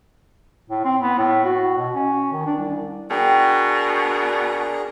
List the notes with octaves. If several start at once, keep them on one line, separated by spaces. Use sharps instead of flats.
A2
C4
B3
A2
F#4
B2
C#4
D#3
D4
C2
B2 D4 G#4 A#4 G5